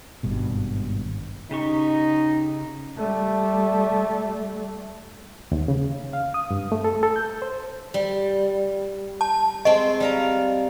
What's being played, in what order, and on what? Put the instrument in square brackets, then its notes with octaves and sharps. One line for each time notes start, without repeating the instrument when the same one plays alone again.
[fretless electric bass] G#1 G2 B2
[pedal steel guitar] C#3 G4 C#6 [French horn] D#4
[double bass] G3 A3
[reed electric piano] D#2
C#3
F5
D#6
G2
A3
A4
A4
G6
C5
[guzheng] G3
[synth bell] A5
[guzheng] G#3 C4 [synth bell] D#5
[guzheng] G3 F5 A#5